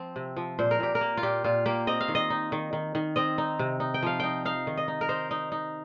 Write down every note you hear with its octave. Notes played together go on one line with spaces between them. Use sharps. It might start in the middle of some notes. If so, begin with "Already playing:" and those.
Already playing: F3 C4
C3
F3
A#2 C5
A#4
A#2 G4
A#4
A#3
F4
A#2 G4
A#2 F4
A#3 G4
C4 D#5
F5
D#3
D#5
D#4
D#3
D#3
D#3
C4 D#5
D#4
C3
D#4
G5
F3 F5
D#4 G5
D#4 F5
D#3
D#5
D#4
A#4
D#4 C5
D#4
D#4